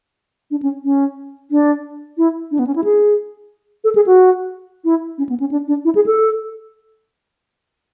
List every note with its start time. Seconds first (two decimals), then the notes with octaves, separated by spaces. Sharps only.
0.51 D4
0.63 C#4
0.84 C#4
1.51 D4
2.18 E4
2.51 D4
2.59 B3
2.67 C#4
2.76 E4
2.84 G#4
3.84 A4
3.95 G#4
4.07 F#4
4.85 E4
5.18 C#4
5.29 B3
5.40 C#4
5.51 D4
5.67 D4
5.85 E4
5.95 G#4
6.06 A4